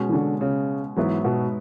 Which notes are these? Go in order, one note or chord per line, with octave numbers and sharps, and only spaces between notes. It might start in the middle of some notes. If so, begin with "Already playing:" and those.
Already playing: B2 G#3 C#4 F#4
E3
D3
C#3
G#2 E3 F#3 B3 E4 B4
B2